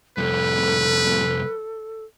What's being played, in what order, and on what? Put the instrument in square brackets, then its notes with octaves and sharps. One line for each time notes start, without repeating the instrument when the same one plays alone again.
[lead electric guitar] C2 F2 [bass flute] A4 [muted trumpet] B4